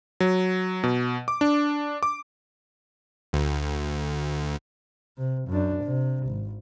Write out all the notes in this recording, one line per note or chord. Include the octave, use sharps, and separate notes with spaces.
F#3
B2
D6
D4
D6
D2
C3
F#2 D4
C3
G#1